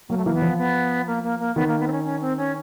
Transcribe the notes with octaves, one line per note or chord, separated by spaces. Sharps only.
F#3 A#3
A3
E3 A#3
B3
F3
B3
A#3
A#3
A#3
D#3 B3
A#3
B3
C4
C#4
C#4
C4
C#4